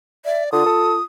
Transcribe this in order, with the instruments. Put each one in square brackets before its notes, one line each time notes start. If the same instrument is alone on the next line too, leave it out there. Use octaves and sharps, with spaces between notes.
[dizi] D5 [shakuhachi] E5
[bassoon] D3 [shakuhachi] F4 [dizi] D#6
[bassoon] A4